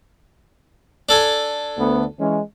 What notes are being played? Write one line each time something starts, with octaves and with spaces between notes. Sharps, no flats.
D4 A4 G#5
D2 B3
E3 G#3 C#4